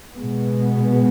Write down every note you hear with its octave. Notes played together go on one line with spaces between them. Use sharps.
B2 G#3 B3